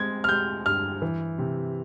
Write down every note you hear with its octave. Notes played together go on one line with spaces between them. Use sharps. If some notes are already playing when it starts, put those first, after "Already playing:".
Already playing: G#3 C4 G#6
F6
G#3 G6
G2 F6
E3
C3